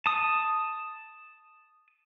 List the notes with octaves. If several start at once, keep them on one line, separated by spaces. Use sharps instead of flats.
A5 D#6